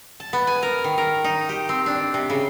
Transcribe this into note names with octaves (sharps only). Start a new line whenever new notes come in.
A5
B3
G#5
A#4
D#3
A#4
D#4
G4
C4
D4
C3
C#3